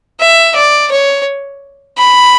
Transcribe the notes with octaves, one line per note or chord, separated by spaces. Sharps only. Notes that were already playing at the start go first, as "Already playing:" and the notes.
E5
D5
C#5
B5